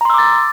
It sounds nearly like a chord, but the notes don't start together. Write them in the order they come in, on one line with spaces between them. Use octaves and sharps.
A#5 C6 E6 D6 A6